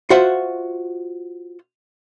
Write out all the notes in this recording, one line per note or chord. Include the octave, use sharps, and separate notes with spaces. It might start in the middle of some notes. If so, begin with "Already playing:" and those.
F4 F#4 C5 E5 F#5